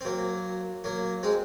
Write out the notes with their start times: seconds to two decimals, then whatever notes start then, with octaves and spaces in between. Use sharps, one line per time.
0.01 C4
0.05 F#3 A#3
0.84 F#3 A#3
1.23 G#3 C4